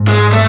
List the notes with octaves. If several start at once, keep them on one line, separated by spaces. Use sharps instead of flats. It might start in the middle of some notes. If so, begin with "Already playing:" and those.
Already playing: G#2
G#3
A3